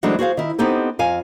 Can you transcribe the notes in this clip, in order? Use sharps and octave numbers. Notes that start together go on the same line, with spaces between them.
E3 F#3 G#3 A3 C4 D4
F#4 G#4 C5 F5
D#3 E4
B3 C4 D#4 G4 A4
F2 F5 G#5